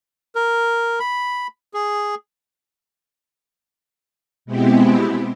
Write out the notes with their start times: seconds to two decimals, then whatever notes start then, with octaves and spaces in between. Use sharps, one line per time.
0.35 A#4
1.00 B5
1.74 G#4
4.45 B2 G#3 B3 C4 E4 G4